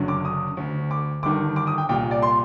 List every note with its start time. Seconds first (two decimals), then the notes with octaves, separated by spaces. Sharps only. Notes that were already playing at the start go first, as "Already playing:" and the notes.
Already playing: F#1 F#2 D3
0.08 D6
0.25 D#6
0.57 D2 D3
0.91 D6
1.23 G1 G2 D#3 D6
1.56 D6
1.67 D#6
1.78 G5
1.89 C2 A#2 G5
2.11 D5
2.22 C6